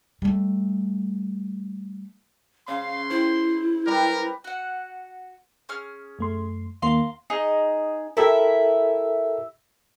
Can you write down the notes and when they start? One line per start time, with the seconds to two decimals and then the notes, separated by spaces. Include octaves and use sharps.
0.22 G3 A3
2.68 C#3 F5 C6
3.10 E4 C5
3.87 G3 A#4 B4
4.44 F#4 F#5
5.69 C#4 G#4 F6
6.19 F#2 A3 C6
6.82 D#2 D#3 A#3 F5 A#5 C6
7.30 D#4 G#4 D#5
8.17 E4 G4 A4 A#4 E5